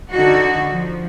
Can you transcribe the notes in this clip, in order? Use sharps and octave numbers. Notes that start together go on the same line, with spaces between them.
D3 D#4 F#4
F3